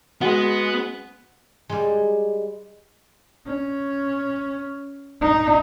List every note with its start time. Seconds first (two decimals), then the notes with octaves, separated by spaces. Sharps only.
0.21 G#3 B3 F#4
1.69 G3 G#3
3.47 C#4
5.21 D#4